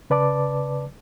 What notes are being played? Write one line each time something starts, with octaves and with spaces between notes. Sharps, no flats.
C#3 B4 D5 A5 D6